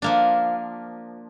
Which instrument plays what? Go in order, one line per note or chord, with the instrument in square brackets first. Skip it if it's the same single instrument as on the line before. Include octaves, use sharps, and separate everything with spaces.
[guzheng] F3 A#3 D4